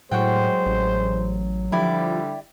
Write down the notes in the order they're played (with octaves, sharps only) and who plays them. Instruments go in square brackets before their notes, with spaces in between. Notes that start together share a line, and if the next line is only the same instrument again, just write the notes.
[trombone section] C2 G#3 C5 [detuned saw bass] A2 [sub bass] F#3 [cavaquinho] F#4 F#5 G5
[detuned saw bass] A1
[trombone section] D3 G3 [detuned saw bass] F3 [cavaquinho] E4 G4 D5